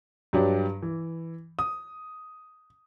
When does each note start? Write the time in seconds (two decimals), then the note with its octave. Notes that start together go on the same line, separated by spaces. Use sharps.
0.33 G2 F#3 D4 G4
0.82 E3
1.59 D#6